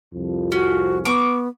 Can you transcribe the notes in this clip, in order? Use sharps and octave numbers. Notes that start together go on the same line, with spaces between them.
C2 F2 F3
C#4 F#4
B3 C#6 D6